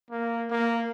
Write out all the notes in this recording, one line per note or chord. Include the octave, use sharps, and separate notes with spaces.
A#3
A#3